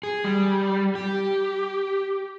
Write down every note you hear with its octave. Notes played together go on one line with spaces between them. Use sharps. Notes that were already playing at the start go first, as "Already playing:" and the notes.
G#4
G3
G4